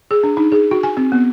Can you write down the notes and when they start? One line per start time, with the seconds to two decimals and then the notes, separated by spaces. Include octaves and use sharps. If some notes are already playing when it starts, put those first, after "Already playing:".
0.11 G#4
0.23 D4
0.37 D#4
0.52 G#4
0.71 F#4
0.83 G#5
0.97 C4
1.12 B3